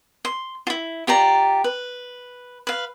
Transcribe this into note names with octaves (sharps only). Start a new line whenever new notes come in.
C6
E4 F4
F4 G4 D5 A#5
B4
B4 F5